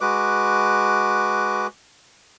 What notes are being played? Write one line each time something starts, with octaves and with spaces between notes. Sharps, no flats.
G#3 F#4 B4 D6